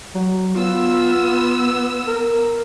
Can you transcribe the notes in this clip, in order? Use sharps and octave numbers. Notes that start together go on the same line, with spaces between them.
F#3
B3 F4 E6
A#4